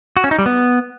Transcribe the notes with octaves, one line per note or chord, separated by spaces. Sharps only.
F#4
C#4
D#4
G3
B3